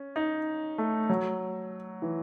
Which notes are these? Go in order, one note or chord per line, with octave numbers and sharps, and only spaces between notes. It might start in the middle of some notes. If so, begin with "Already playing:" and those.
Already playing: C#4
D#4
A3
F#3
E3